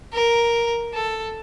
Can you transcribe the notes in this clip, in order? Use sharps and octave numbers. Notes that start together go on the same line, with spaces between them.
A#4
A4